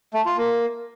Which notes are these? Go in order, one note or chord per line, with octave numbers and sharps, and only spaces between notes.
A3
F4
A#3